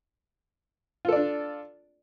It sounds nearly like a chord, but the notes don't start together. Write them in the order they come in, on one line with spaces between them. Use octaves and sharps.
F4 A4 D5 D4